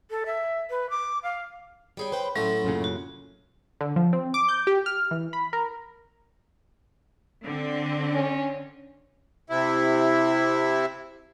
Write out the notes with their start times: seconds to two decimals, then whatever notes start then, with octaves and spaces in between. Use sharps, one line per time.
0.10 A4
0.26 E5
0.70 B4
0.90 D6
1.23 F5
1.97 G3 G#4 C#5 G5 B5
2.12 B4 C5 G5
2.36 A2 F#3 A3 C#4 E4 C6
2.64 F#2 A#2 C#3
2.84 F#4
3.81 D3
3.96 F3
4.13 C4
4.34 D6
4.48 G6
4.67 G4
4.86 F6
5.11 E3
5.33 B5
5.53 A#4
7.45 D3 C4
8.14 C#4
9.50 C3 E4